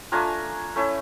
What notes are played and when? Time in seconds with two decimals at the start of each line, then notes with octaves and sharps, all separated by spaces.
0.12 A3 D4 F4 G#5 A#5
0.76 A3 C#4 E4